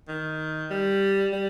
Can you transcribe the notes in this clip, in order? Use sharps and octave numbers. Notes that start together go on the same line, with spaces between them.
D#3
G3
G3